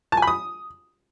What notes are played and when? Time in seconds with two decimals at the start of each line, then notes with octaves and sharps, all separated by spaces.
0.12 A5
0.17 G#5
0.22 B5
0.27 D#6